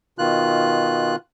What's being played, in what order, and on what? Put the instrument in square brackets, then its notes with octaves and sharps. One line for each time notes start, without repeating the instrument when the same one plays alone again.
[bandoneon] B2 D#3 F4 F#6